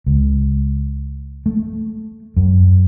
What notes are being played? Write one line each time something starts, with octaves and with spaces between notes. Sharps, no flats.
C#2
A3
F#2